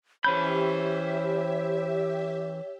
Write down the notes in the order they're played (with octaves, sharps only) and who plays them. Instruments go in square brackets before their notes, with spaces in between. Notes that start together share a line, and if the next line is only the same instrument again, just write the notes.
[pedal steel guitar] E3 C#4 G6 [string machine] G4 E5 [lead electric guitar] C5 B5 [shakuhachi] C#5